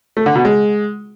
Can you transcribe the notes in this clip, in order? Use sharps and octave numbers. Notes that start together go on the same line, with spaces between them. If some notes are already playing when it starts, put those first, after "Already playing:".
A3
D3
B2
G#3